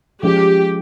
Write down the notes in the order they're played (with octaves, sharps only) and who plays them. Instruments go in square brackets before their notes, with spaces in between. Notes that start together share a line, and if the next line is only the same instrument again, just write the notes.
[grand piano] F3 G#3 C#4 G#4 [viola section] G4